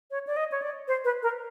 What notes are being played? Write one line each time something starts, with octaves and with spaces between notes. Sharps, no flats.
C#5
D5
D#5
C#5
D5
C5
B4
A#4